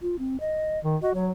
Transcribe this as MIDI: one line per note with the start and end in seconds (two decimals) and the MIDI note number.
0.02 0.16 65
0.19 0.37 60
0.40 0.79 75
0.84 0.97 51
1.03 1.14 66
1.03 1.13 75
1.14 1.31 54
1.14 1.26 73